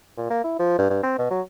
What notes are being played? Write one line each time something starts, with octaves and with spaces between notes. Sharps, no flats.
A#2
A#3
E4
F3
G2
G2
C4
B2
F#3